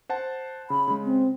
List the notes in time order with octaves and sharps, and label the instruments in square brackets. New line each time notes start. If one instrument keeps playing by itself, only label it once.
[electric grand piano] C5 F#5 A5
[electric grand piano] C#3 [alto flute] B5
[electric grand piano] C#3 G#3
[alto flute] C4